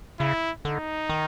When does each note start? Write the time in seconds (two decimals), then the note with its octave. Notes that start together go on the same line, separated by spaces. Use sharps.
0.20 C#3 E4
0.65 D3 D#4
1.09 D#3